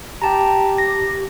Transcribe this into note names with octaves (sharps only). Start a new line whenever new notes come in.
G4 G5 A5 A#5
A#6